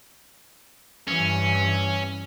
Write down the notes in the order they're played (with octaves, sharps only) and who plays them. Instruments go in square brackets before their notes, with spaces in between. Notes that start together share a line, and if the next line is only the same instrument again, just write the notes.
[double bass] G2 E3 [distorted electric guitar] C#4